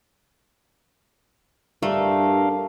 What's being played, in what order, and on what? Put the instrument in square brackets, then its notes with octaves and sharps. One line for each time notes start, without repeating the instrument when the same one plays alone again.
[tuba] G2 [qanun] A3 [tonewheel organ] D4 A#4 F5